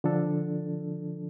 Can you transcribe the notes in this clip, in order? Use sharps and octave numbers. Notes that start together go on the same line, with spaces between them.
D3 F3 D4 A4